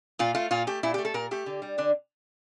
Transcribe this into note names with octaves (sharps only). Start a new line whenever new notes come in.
A#2 F4
A3 F4
A#2 F4
A3 G4
A#2 E4
G4
A3
A4
A#2 A#4
A3 G4
D3
G3
D3 D4